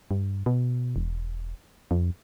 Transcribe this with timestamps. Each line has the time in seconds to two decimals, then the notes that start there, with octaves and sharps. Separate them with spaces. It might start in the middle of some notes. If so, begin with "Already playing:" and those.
0.11 G2
0.46 B2
0.96 E1
1.91 F2